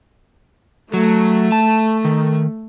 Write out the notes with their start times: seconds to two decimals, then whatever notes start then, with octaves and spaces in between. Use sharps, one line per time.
0.94 F#3 A3
1.52 A5
2.05 D#3